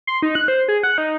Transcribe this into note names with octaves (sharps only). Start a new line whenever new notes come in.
C6
D#4
F#6
C5
G#4
F#5
D#4